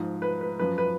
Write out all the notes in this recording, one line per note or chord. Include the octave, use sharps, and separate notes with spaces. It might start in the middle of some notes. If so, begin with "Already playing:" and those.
Already playing: G#2 F3
B4
B4
F#2 F3 B4
B4